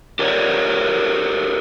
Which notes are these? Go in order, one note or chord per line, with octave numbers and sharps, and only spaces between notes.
G4 A4 A#4 C#5 D5